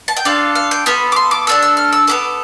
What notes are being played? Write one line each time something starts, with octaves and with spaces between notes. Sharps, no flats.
A5
G5
D4 F4 A4 F5
F5
G5
B3 F4 A4 B5
D6
C6
D6
A3 D4 F4 A4 E6
E6
F6
E6
B3 E4 A4 D6